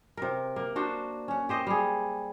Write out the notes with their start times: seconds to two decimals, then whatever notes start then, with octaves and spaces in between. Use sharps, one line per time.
0.17 C3 A#4
0.56 A#3
0.76 D4 F#4 C5
1.28 C#4 F#5
1.49 G4 C5 D#5
1.67 G3 G#4